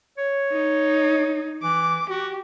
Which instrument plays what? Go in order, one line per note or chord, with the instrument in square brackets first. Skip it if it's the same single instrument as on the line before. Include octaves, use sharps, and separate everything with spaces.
[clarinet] C#5
[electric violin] D#4
[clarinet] E3 [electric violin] D6
[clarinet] F#4 [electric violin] G4